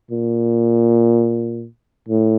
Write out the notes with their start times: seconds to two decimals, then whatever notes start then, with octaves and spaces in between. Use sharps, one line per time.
0.11 A#2
2.09 A2